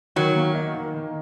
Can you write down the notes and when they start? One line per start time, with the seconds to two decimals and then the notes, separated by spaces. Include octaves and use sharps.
0.16 D#3 F#3
0.36 A#3
0.55 D#4
0.75 D#3
0.94 D#3